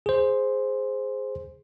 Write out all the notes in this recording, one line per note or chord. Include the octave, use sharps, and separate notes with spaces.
G#4 C5